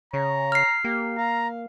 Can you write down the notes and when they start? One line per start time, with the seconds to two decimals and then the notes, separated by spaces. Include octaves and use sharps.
0.14 C#3 C#5 A#5
0.52 F6 C7
0.84 A#3 G4
1.18 F5 A#5